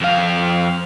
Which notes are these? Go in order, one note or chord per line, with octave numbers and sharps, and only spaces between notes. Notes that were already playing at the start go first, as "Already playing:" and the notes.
F2 F5